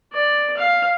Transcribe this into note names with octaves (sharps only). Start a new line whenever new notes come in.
D5
F5